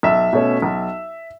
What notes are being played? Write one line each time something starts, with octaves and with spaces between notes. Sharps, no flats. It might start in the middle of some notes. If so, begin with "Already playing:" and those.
B1 E5
B2 A3 C#4
B1